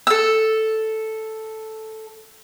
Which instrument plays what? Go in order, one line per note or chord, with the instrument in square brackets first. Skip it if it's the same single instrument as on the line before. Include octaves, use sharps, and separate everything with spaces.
[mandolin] A4 E6